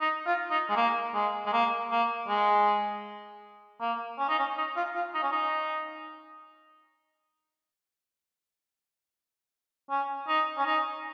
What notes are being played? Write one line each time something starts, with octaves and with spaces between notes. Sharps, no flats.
D#4
F4
D#4
G#3
A#3
G#3
G#3
A#3
A#3
G#3
A#3
C#4
D#4
C#4
D#4
F4
F4
D#4
C#4
D#4
C#4
D#4
C#4
D#4